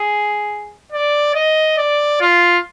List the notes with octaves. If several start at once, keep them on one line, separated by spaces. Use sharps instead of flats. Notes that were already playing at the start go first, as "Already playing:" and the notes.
Already playing: G#4
D5
D#5
D5
F4